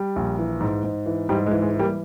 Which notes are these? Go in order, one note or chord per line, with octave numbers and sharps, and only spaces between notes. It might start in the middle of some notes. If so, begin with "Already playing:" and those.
Already playing: G3
A#1
E3
G#2
G#2
E3
G#2 G3
G#3
E3
G#3
E3
G3 A#3